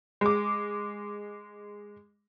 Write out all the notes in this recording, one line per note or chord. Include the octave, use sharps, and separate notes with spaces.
G#3 D6